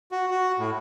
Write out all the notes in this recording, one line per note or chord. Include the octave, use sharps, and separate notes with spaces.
F#4
F#4
A2